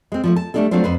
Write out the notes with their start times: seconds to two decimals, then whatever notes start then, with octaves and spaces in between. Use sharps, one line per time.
0.12 G#3 C4
0.24 F3 G3 A3
0.36 A5
0.54 G3 A3 A#3 D4 F4 A4
0.71 F#3 A3 C4 D4 F4 C5
0.84 F2 B4 C5